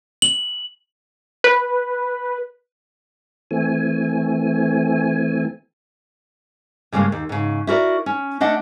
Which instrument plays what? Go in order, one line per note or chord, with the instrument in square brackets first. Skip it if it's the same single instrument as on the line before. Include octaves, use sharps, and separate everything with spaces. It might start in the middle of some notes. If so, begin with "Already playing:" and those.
[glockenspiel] F#7
[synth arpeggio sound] B4
[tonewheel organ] E3 A3 C4 G#5
[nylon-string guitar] G2 C#3 G3 G#3 A#3
D#2
G#2 C#3
E4 F#4 A#4 D5
C#4
A3 D4 D#5 F#5